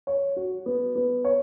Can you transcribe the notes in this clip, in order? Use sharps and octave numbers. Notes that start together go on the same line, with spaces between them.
C#5
F#4
B3
B3
C#5